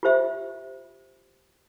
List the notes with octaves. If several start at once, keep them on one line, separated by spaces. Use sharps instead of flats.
F4 G4 C5 E5